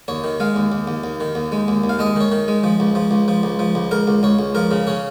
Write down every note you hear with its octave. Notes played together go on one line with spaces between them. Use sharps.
D#2 C#5
D#3
G#3 F5
D#2
D#2
D#2
D#2
D#3
D#2
G#3
D#2
D#2
F5
G#3 D#5
D#3 C#5
D#3
G#3
F3
C#2
F3
C#2
F3
C#2
F3
C#2
C#2 A#4
C#2
C#2 C#5
C#2
F3 A#4
C#3
C#3 C#5